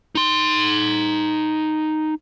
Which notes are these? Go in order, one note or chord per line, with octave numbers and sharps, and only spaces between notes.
D#4 C6